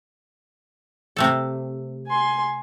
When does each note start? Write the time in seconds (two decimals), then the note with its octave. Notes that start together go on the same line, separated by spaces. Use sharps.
1.16 C3 A3 A4
2.07 G#5 C6